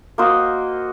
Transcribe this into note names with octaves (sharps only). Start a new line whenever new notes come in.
A#3 F#4 C5 D#5